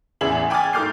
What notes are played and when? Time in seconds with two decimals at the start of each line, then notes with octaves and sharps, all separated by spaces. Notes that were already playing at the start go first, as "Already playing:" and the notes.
0.21 A1 E2 G#4 E5 G#6 F#7
0.50 G5 G#5 D6 D#6 F6 A6
0.73 G#2 A3 D6 F6 G6 C7